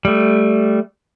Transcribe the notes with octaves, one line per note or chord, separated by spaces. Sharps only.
G3 A3